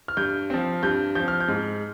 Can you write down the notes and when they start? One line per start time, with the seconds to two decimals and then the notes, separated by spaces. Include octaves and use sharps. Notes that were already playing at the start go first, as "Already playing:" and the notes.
0.08 F6
0.17 G2 G6
0.50 F3 C4
0.83 G2 G6
1.15 F3 C4 G6
1.28 F6
1.40 G6
1.48 G#2